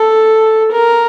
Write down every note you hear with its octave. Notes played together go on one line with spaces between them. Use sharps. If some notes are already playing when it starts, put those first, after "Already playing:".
Already playing: A4
A#4